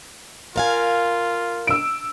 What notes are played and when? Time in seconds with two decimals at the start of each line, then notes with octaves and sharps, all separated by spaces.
0.56 F4 A#4 F5 G#5
1.67 E6 D7